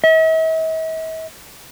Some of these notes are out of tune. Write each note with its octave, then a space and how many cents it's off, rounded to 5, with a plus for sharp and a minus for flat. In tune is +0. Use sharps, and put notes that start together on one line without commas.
E5 -45